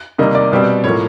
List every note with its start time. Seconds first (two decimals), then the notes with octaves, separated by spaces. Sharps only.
0.18 C3 D#3 G3 A#3 D#5
0.35 D5
0.52 B2 G3 C4
0.84 A2 F3 A#3 C#5